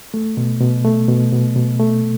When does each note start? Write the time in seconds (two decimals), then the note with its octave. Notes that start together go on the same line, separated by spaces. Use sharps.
0.14 A3
0.37 B2
0.61 B2
0.85 A3
1.08 B2
1.32 B2
1.56 B2
1.80 A3